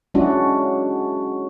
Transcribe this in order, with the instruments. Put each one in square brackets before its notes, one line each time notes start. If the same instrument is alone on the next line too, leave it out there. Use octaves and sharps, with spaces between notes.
[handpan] F#3 G#3 C#4 D4 E4 F#4